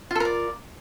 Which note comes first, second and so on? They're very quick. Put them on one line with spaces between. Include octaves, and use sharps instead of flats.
F4 A4 A#4 D5